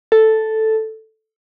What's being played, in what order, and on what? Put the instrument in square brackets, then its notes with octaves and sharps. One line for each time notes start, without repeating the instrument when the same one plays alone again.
[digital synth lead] A4